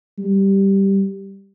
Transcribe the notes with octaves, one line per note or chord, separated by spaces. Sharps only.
G3